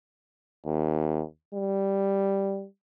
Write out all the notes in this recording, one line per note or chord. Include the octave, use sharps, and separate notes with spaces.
D#2
G3